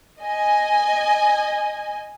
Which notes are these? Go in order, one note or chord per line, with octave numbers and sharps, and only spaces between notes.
D#5 G#5